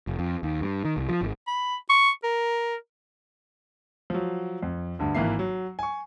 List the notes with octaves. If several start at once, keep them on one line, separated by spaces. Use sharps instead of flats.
F1
F2
D#2
G2
D#3
C2
F3
G#1
B5
C#6
A#4
F3 F#3
F2
D2 G2
G#1 E3 A#3 E5 C7
F#3
G#5 C#6